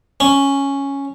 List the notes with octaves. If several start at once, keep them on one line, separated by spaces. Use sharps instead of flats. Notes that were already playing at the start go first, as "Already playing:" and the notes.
C#4